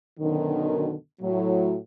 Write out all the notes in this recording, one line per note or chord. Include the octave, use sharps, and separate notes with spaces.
F#2 B2 D3 D#3
A2 F#3